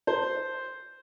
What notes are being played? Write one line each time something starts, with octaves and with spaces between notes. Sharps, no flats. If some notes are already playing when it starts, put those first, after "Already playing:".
C5